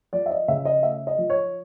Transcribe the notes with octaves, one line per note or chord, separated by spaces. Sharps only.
F3 D5
E5
D#5
C#3 E5
D#5
A3 E5
D#5
F3
C#5